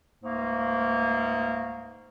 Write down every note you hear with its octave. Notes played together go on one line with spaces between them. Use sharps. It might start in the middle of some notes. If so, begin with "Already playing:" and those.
C#2 G#2 A3 A#3